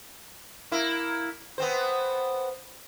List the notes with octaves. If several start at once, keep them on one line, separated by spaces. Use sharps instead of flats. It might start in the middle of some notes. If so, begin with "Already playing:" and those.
A#3 E4
B3 C4 C5